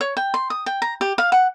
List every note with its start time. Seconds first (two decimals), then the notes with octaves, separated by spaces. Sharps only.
0.01 C#5
0.17 G5
0.34 C6
0.50 D#6
0.66 G5
0.82 A#5
1.01 G4
1.18 F5
1.32 F#5